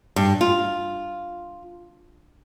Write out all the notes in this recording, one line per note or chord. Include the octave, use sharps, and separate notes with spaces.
G2
F4